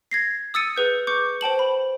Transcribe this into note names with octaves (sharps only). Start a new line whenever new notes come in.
G#6 A#6 C7
D#6 E6 A6 C#7 D#7
G#4 B4 G6
C#6 D6 G6 C#7
C5 G5 A5 F#7
B5